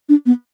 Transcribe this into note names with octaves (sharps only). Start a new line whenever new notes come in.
D4
B3